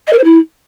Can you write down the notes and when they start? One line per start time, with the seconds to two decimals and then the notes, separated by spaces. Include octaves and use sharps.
0.07 D#5
0.13 A#4
0.18 C5
0.24 E4